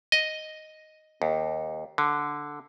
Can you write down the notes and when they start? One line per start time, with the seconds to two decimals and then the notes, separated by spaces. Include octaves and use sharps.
0.12 D#5
1.22 D#2
1.98 D3